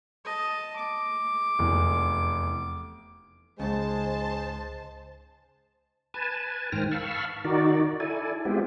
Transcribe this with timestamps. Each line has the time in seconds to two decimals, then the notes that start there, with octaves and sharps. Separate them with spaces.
0.24 D#5 A5
0.76 D6
1.59 F1 E2
3.60 C#2 G#2 C#3 G#3 C5 A5
6.14 B4 G#5 A5
6.72 G#2 D#3 C5 G5 F6 A#6
6.91 F5 A5 B5 C#6 E6 F6
7.45 D#3 D#4 F#4 D5
8.00 E4 A4 D5 G#5
8.45 G#3 B3 C4 E4 F4 G4